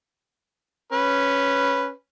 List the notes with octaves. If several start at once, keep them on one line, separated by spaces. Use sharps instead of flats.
C#4 B4